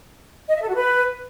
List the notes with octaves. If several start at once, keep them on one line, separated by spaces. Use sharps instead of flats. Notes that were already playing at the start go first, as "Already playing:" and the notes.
D#5
E5
A4
F#4
B4